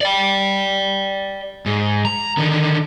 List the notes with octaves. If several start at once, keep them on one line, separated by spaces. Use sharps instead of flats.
D5 G5
G#2
A#5
D3 D#3